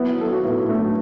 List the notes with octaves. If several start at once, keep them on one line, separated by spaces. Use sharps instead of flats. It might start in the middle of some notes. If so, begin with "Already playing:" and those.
Already playing: F#3 B3 E4
F#3
A4
F#3 F#4
A2 B3 E4
A2
A3 D4
F#3